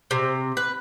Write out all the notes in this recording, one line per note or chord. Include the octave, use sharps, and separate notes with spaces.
C3
B4